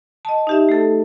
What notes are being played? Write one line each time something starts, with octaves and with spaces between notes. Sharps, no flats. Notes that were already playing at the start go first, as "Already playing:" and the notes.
D#5 A5
D#4 G4 E5
A3 A4